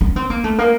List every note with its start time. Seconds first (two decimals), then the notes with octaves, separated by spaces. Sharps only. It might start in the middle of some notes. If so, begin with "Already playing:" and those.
0.01 C#4
0.16 C4
0.30 A#3
0.44 A3
0.58 A#3